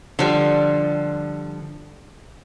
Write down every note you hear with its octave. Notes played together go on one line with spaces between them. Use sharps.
D3 F3 G3